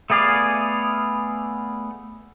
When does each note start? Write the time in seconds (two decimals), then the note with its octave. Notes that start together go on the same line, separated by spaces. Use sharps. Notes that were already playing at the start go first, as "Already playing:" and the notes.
0.10 A3 B3 G#4 D5 F5